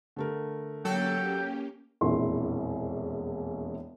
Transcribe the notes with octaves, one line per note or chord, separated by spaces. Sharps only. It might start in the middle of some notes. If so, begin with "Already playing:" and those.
D3 A3 A#4
F#3 A#3 C#4 G4 A4 G5
E1 A#1 F2 E4 C6